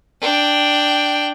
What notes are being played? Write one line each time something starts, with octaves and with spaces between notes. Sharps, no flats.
D4 G5